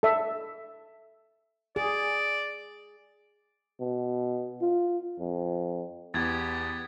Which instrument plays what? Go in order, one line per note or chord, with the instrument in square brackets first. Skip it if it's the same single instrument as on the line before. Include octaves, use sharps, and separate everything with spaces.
[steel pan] A4 E5
[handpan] G#4 [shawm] D5
[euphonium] B2
F4
F2
[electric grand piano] E2 [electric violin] B3 G4 [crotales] G#6 A6